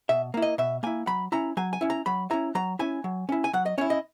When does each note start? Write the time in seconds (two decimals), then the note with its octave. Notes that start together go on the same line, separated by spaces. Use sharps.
0.09 B2 E5
0.34 A#3 E4
0.42 D#5
0.58 B2 E5
0.83 A#3 E4 G#5
1.07 F#3 B5
1.32 C#4 E4 A#5
1.57 F#3 G#5
1.73 G#5
1.81 C#4 E4
1.90 A#5
2.06 F#3 B5
2.31 C#4 E4 A#5
2.55 F#3 A#5
2.79 C#4 E4 G#5
3.04 F#3
3.29 C#4 E4
3.44 G#5
3.53 F#3 F#5
3.66 D#5
3.78 C#4 E4 C#5
3.90 D#5